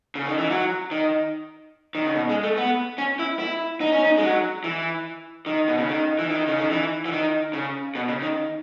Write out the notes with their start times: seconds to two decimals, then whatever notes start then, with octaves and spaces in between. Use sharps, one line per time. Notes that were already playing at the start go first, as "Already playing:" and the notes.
0.15 C#3
0.26 D#3
0.38 E3
0.50 F#3
0.91 D#3
1.95 D#3
2.06 C#3
2.15 B2
2.29 G#3
2.43 A3
2.57 B3
2.98 C#4
3.19 E4
3.39 E4
3.81 D#4
3.92 C#4
4.04 D#4
4.18 G#3
4.23 F#3
4.64 E3
5.46 D#3
5.68 B2
5.78 C#3
5.88 D#3
6.19 E3
6.30 D#3
6.47 C#3
6.59 D#3
6.70 E3
7.06 E3
7.12 D#3
7.53 C#3
7.95 B2
8.08 C#3
8.22 D#3